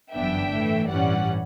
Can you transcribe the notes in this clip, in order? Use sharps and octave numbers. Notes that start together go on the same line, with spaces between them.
G1 F#2 E3 B3 D4 E5 G5
A2 E3 A3
A1 G2 E3 G3 C#4 D5 F#5